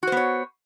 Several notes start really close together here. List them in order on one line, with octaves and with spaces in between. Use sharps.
F#4 C5 B3 C#5